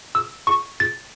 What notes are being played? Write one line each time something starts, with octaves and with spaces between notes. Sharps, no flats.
E6
C#6
A6